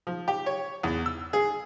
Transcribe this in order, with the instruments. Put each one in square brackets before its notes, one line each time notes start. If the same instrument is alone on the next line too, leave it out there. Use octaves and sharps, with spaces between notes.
[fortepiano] F3
G4
C#5
E2
E6
G#4